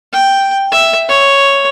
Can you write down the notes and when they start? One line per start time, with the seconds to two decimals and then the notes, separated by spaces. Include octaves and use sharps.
0.13 G5
0.72 E5
1.09 C#5